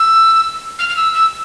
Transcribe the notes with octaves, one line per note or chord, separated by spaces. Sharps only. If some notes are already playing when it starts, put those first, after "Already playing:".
Already playing: E6
F6
F6
E6
E6